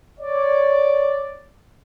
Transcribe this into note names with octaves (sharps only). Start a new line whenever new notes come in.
C#5 D5